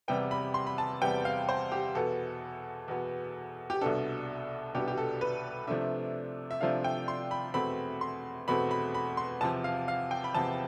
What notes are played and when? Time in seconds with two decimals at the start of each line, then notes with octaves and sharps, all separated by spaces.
0.08 E2 C3 G3 B3 G5
0.31 B5
0.54 C6
0.67 B5
0.78 A5
1.02 E2 C3 G3 B3 G5
1.25 F5
1.49 C5
1.72 G4
1.95 E2 B2 B3 A4
2.88 E2 B2 B3
3.70 G4
3.81 C2 B2 B3 D4 A4
4.74 C2 B2 B3 D4 G4
4.88 G4
4.98 A4
5.21 B4
5.67 C3 F3 A3 D4 E5
6.51 E5
6.61 C3 F3 A3 D4 F5
6.84 G5
7.08 C6
7.31 B5
7.54 E2 B2 A3 C4 B5
8.01 C6
8.48 E2 B2 A3 C4 B5
8.71 B5
8.95 B5
9.17 C6
9.41 E2 C3 F3 A5
9.64 F5
9.88 F5
10.11 G5
10.24 B5
10.34 E2 C3 F3 A5